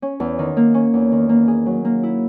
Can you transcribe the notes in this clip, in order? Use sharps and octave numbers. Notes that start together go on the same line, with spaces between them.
C#4
E2
D#3
A#3
C#4
E2
D#3
A#3
G#4
F#3
A#3
E4